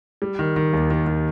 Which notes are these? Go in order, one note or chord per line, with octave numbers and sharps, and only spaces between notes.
G3
D#3
D#3
D#2
D#3
D#3